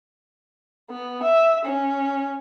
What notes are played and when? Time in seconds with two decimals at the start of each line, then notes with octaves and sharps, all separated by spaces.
0.90 B3
1.23 E5
1.65 C#4